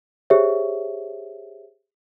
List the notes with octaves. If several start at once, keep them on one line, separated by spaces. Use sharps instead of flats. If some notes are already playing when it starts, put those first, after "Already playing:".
G4 G#4 C5 C#5 E5